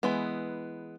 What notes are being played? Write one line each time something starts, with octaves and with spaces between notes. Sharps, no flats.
E3 G#3 B3